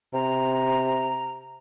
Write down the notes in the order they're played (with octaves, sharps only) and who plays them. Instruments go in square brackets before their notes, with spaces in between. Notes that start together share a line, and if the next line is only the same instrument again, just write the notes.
[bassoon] C3 [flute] A#5